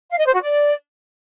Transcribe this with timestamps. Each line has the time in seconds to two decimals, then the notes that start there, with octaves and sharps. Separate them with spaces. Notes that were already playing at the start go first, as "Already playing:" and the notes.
0.10 F5
0.18 D#5
0.26 C5
0.34 F#4
0.42 D5